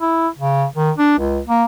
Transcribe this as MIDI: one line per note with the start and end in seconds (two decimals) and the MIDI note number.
0.01 0.28 64
0.39 0.65 49
0.76 0.91 51
0.98 1.17 62
1.19 1.40 37
1.48 1.64 58